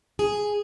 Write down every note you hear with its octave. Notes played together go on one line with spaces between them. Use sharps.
G#4